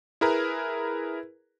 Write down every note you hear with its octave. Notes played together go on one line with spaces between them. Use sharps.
E4 G#4 A#4 B4 A#5